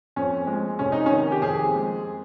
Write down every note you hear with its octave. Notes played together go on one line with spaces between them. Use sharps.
F2 C#4
G#3
F1 C#4
D#4
D#3 C#4
G4
F2 G#4
G#3